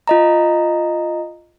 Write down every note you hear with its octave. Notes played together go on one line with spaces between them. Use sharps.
F4 D#5 A#5